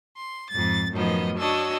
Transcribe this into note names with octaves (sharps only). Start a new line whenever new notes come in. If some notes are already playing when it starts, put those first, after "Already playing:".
C6
F2 G#2 A6
F#2 A2 D#3 F3 B3 D#5
D4 F#4 C#5 D#5 E6